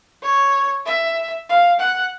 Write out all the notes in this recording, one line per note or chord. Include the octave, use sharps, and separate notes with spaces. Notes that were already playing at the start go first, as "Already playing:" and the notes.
C#5
E5
F5
F#5